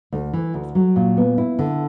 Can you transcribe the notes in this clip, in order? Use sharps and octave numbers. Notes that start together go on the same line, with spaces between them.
D2
E3
D2
F#3
A#2
B3
E4
D3